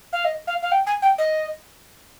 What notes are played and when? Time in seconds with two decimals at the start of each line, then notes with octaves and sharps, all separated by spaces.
0.12 F5
0.25 D#5
0.47 F5
0.62 F5
0.71 G5
0.86 G#5
1.02 G5
1.18 D#5